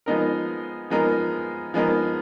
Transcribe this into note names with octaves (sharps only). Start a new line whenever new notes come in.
F3 G#3 B3 D#4 A#4
F3 G#3 B3 D#4 A#4
F3 G#3 B3 D#4 A#4